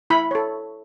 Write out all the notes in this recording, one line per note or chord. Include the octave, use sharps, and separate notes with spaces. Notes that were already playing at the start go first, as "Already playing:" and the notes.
E4 B5
A4 C#5